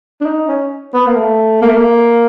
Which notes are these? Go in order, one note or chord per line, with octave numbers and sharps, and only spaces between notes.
D4
D#4
C#4
B3
A#3
A3
A#3
A3
A#3